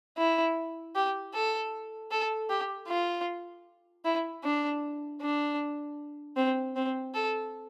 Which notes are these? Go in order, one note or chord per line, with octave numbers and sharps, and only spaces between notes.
E4
G4
A4
A4
G4
F4
E4
D4
D4
C4
C4
A4